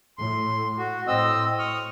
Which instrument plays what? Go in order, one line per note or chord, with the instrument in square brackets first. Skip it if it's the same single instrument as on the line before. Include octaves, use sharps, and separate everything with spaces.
[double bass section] A2 [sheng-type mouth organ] C6
[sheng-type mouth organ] F#4
[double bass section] A2 [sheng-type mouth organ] C4 D#5 E6
[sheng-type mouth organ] C#6 D#6 F6